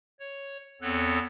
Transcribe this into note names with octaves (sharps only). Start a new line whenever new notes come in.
C#5
E2 B3 C4 A4 C#5 F#6